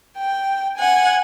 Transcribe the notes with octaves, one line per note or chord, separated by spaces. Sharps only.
G5
F#5 G#5